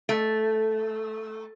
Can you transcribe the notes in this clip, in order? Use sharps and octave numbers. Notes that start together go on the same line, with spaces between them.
A3